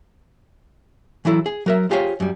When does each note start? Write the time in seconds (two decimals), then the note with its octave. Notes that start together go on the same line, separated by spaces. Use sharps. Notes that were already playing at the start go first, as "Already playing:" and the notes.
1.25 E3 F#3 E4 A4
1.46 G#4
1.66 F#3 A#4 E5
1.91 F4 G4 G#4 C5 C#5 F5
2.20 F#2 G3